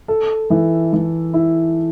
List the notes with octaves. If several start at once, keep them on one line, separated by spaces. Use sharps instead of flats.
A4
E3
E3
E4